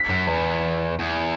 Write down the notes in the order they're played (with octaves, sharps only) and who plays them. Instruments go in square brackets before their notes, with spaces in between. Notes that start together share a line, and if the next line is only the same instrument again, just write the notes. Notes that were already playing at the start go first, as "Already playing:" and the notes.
Already playing: [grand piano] B6
[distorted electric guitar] F#2
E2
E2